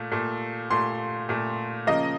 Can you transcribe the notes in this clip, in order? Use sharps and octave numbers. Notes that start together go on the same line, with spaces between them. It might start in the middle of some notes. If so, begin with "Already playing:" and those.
Already playing: A#2 A3
A#2 A3
A#2 A3 C6
A#2 A3
C#3 F3 A#3 D#5